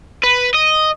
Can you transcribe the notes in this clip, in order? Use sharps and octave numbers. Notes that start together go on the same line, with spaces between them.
B4
D#5